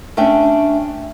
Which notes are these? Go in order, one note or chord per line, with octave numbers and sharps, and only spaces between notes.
A3 C#4 D4 E5 G5